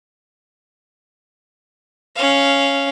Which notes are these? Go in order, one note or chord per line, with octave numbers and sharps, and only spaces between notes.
C#4 F5